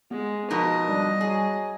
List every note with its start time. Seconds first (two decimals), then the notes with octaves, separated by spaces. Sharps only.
0.11 G#3 B3
0.51 F2 B2 D#4 A#4 D#5
0.89 G3 D4
1.21 F#3 G#4